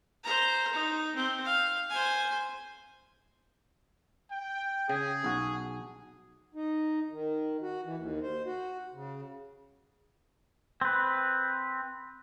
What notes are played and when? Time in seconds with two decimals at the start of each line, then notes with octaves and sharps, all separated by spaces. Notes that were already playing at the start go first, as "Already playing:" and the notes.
0.24 C5 A#5
0.73 D#4
1.16 C4
1.45 F5
1.90 C5 G#5
4.31 G5
4.89 C#3 G#4 G5
5.24 B1 F#4
6.55 D#4
7.11 D#3
7.62 F#4
7.84 E3
7.97 D#2
8.22 C5
8.46 F#4
8.93 C#3
10.81 C4 B4